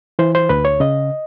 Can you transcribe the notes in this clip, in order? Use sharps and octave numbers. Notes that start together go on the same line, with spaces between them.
E3 C5
C5
D2 B4
C#5
C#3 D#5